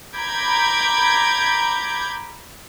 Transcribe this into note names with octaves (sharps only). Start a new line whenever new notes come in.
A#5 B5 D6 G6 G#6